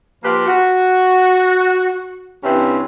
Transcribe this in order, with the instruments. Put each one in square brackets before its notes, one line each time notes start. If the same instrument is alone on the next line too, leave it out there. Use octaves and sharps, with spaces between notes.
[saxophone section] F3 A#3 F4 G4 B4
F#4
G2 C3 E3 C#4 C5 E5